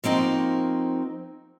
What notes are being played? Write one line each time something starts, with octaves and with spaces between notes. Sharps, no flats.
F3 A#3 C4 D#4 F#4